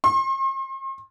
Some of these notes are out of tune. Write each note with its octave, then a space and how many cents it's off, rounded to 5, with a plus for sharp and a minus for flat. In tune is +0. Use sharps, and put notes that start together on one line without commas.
C6 +40